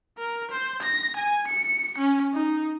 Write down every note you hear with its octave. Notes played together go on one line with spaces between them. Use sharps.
A#4
C5
A#6
G#5
C#7
C#4
D#4